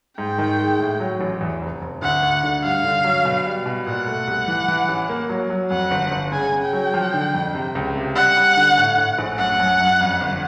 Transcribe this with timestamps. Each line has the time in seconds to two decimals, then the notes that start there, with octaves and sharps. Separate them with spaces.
0.18 G#2 G5
0.38 D#3
0.59 G#3
0.79 A2
1.00 F#3
1.21 A1
1.41 E2
1.61 F1
1.82 F1
2.02 D2 F#5
2.23 D2
2.43 D3
2.64 G2 F5
2.84 D3
3.04 F#3
3.25 B2
3.46 G3
3.66 B2
3.86 A#2 F#5
4.07 A3
4.27 C2
4.48 E3
4.68 E3
4.89 A1
5.09 A#3
5.29 F#3
5.50 F#3
5.71 F2 F#5
5.91 G1
6.12 G1
6.32 C#3 G#5
6.52 C#3
6.63 G5
6.73 F#3
6.94 F3
7.14 D3
7.34 F2
7.55 C3
7.75 C#2
7.96 C3
8.16 G3 F#5
8.37 G3
8.57 D3
8.77 A2
8.98 A2
9.18 A#1
9.38 F#2 F#5
9.59 F#2
9.80 F#2
10.01 F2
10.21 G1